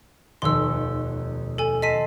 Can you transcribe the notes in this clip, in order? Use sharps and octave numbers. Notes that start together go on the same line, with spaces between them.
F1 D#2 B2 C6 E6
A4 G#5
D#5 A5 C6 E6 B6 D#7